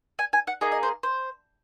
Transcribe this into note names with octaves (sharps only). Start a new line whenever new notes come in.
G#5
G#5
F#5
A#3 D#4 G#4 D#5
D#5
C5
C5